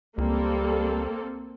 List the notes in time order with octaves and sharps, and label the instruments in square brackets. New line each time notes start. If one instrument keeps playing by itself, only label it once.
[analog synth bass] C#2 [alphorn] G3 [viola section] A#3 C4 A4